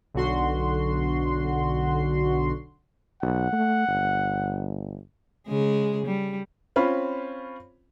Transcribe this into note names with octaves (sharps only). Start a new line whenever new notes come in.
B1 D3 F#4 C6
B1 F#5
A3
G1
C#3 G#3 G#4
G3
C4 C#4 F4 B5